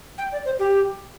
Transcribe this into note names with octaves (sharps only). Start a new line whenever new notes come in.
G5
D5
C5
G4